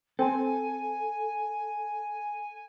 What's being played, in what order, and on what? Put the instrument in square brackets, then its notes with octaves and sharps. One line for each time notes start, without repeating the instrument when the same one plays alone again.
[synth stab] C4 [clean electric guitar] A4 [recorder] G#5